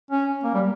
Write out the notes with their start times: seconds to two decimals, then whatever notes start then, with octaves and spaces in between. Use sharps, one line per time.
0.10 C#4
0.44 A#3
0.54 G3